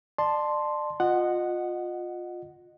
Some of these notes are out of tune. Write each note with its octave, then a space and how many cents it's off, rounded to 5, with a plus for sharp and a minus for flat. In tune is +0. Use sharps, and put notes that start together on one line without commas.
D5 +35 A5 +0 C6 +0
F4 +20 D#5 -20 F#5 +0